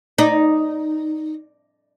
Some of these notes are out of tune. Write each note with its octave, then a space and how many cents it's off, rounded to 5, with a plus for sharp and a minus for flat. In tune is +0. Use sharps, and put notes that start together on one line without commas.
D#4 +0 D5 +0